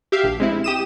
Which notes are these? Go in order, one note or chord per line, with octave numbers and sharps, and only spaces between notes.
G4 E5 F5
A#1
G#3 C4 E4
G4 D#6 E7